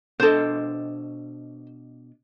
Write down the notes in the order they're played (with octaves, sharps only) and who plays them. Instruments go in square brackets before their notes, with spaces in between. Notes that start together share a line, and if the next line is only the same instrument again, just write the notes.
[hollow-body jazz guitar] B2 D4 D#5 [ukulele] A4 C5